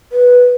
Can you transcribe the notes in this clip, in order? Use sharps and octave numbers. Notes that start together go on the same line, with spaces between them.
B4